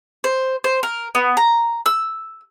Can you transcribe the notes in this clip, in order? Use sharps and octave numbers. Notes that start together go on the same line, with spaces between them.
C5
C5
A#4
B3
A#5
E6